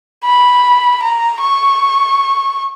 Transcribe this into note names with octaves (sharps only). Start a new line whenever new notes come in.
B5
A#5
C#6